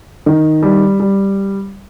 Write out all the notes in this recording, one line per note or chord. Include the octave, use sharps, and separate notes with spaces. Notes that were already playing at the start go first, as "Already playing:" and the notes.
D#3
G3
G3